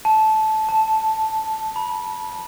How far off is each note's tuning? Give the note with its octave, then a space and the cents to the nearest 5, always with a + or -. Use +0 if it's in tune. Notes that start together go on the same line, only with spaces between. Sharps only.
A5 -15
A5 +0
B5 -30